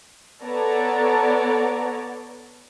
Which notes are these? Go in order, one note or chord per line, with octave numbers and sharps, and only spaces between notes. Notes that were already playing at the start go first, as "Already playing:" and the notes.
B3 A4 C#5 D5 A5 A#5